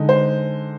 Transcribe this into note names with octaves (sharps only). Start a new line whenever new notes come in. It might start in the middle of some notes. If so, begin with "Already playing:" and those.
Already playing: D3 G#3 D#4
C5